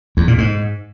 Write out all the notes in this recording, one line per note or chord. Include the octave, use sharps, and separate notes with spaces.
E2
A#2
G#2